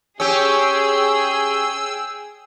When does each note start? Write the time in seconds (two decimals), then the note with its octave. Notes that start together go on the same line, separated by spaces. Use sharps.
0.20 C#4 G4 G#4 G5 E6